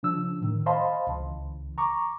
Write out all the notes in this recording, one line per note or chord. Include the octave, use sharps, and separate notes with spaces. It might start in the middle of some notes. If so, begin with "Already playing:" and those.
C#3 F3 D4 E6
A2 D#3
C5 D#5 F5 A5 B5 C6
C#2 C#3 E3
A#5 C#6 D6